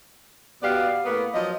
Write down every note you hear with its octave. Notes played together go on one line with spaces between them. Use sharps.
B2 B3 G4 D5 F5
A2 A#3 B3
F3 F#3 D#5